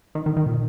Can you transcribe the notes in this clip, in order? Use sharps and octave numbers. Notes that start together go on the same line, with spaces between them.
D#3
D#3
D#3
A#2